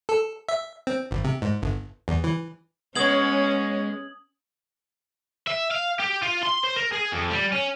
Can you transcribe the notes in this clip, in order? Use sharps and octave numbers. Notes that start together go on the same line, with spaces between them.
A4
E5
C4
G#1
C3
G#2
G1
E2
E3
G#3 B3 C#4 C#5 D#6 G#6 F#7
E5
F5
G4
F4
C6
C5
A#4
G#4
F2
G3
C#4